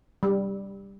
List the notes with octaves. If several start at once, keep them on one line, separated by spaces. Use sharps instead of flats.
G3